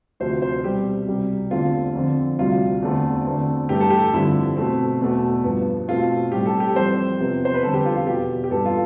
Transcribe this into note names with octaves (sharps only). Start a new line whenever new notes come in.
D2 C3 F3 C5
C5
B2 G3 C4 G4
C2 C3 G3
E2 D3 A3 C4 F4
F2 D3 F3 C4
D2 C3 G3 F4
E2 D3 A3 C4
E2 D3 A3 C4
G2 E3 A3 G4
A4
G4
G2 D3 F3 C4 E4
B2 A3 C4
E2 B2 A3
G2 F3 B3
B2 A3 C4 F4
A2 G3 C4 G4
A4
G4
F2 E3 G3 C4 C5
E2 C3 F3 B3
C5
B4
F2 D3 G3 B3 A4
G4
F4
F4
E2 B2 B3 G4
G4
G2 E3 B3 A4
F4